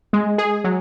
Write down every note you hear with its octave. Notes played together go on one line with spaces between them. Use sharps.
G#3
G#4
F#3